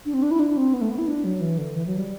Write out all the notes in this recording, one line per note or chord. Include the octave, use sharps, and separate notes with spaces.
D4
C4
D4
E4
D4
C4
B3
A3
B3
E4
D4
F#3
E3
D3
E3
F#3
G3